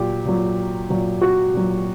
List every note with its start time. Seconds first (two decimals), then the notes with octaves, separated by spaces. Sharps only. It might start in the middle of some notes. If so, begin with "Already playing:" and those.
Already playing: A#2 F#3 G4
0.25 A#2 F#3
0.90 A#2 F#3
1.21 F#4
1.54 A#2 F#3